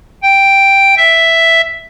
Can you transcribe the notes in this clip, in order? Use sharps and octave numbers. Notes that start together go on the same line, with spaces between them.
G5
E5